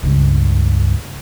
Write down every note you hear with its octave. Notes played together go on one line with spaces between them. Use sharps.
C#2 G2